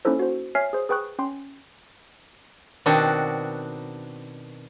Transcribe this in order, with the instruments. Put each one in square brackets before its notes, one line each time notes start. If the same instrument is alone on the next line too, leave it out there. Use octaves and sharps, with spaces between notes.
[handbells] A#3 C#4 D#4 E4 A4 C5
F#4 C5
C#5 E5 G#5 F6 B6 C7
G#4 C5
G#4 B4 G5 C#6 F#6
C#4 G5 C6
[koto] B2 D#3 C4 D4 F#4